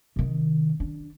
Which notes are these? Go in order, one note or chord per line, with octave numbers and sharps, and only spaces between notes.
C3 D#3
D4